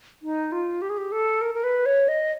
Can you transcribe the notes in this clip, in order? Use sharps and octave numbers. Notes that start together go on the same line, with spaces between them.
D#4
F4
G4
G#4
G4
A4
A#4
A#4
B4
C#5
D#5